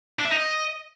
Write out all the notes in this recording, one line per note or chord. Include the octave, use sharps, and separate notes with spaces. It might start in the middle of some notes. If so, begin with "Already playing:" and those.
D4
E5
D#4
D#5